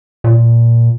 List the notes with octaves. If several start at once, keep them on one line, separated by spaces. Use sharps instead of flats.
A#2